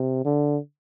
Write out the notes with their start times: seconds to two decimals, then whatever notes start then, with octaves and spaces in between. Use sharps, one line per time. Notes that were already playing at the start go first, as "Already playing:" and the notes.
Already playing: C3
0.25 D3